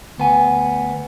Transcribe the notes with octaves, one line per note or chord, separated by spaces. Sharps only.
D2 B3 G#5